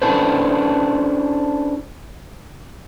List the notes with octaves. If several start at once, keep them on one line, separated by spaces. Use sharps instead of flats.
C#4 D4 E4 A4 B4 C5